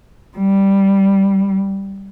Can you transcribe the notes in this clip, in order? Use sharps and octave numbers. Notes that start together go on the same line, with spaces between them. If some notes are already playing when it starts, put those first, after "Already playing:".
G3